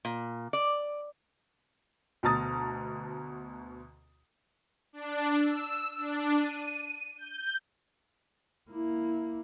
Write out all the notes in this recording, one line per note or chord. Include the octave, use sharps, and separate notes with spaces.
A#2
D5
D2 B2 A5 A#5 D#6 A6
D4
E6
D4
D#7
G6
A#3 E4